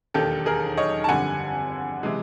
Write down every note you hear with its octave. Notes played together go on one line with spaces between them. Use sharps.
E1 D#2 D#3 G4 A4
G#4 A#4
C#5 D#5
A5
G1 F2 D3 G3 F#5 G#5
C3 E3 G#3